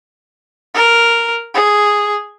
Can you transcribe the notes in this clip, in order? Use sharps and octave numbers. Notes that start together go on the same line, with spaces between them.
A#4
G#4